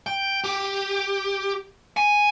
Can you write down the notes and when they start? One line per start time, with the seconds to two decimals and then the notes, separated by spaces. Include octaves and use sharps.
0.06 G5
0.44 G4
1.97 G#5